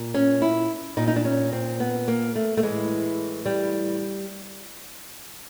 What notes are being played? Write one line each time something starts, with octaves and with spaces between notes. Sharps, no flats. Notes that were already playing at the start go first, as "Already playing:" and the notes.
Already playing: A#2
C#4
E4
A#2 D#4
D#4
D4
C#4
C4
B3
A#3
A3
A3
A2 E3 G#3
G3